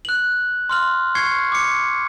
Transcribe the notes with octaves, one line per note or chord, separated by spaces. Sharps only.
F#6 F#7
C6 F6 F#7
C#6 G#6 C7 C#7
D6 C#7